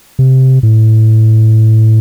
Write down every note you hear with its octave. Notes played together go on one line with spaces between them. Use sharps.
C3
A2